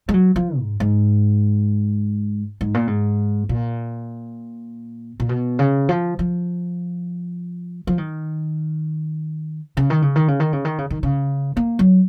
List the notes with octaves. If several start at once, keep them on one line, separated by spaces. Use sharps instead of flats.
G#3
F#3
F3
G#2
G#2
G#2
A#2
G#2
A#2
A#2
B2
C#3
F3
F3
F3
D#3
C#3
D#3
C#3
D#3
C#3
D#3
C#3
D#3
C#3
D#3
C#3
A#3
F#3